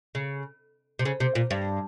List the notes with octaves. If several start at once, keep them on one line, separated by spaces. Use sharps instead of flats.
C#3
C3
C#3
C3
A#2
G2